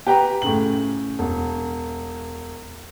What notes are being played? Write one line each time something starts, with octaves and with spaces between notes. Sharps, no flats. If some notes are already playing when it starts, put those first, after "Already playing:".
G4 B4 G5 A#5
A2 C#3 F#7
E1